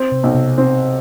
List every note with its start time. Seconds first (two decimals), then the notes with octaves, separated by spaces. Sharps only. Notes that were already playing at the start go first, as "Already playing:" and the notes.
Already playing: C4
0.12 C3
0.23 B1
0.35 C3
0.58 C4